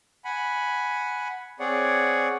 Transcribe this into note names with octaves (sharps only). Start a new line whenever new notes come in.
F#5 G#5 B5
C4 G#4 C#5 D5 F#5